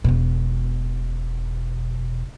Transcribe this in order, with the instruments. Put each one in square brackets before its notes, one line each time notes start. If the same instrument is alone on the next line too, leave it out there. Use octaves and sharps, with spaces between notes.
[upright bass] E1 B2